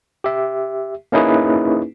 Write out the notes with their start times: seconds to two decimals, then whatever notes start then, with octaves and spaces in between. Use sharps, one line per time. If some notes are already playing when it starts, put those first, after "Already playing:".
0.24 G4 E5
1.12 A#3 C#4 D#4 E4 G#4 B4